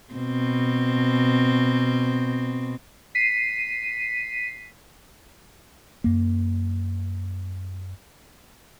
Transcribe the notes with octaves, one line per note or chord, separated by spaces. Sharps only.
B2 C4
B6 C7 D#7
F#2 A#3